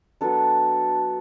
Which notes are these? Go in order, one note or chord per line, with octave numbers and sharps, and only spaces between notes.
F#3 B3 D4 A4